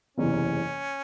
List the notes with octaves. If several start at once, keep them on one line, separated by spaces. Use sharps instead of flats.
F#1 E2 C3 E3 C#4